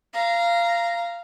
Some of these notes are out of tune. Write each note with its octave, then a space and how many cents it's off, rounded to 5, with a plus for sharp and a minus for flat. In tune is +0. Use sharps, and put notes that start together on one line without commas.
F5 -15 A#5 +0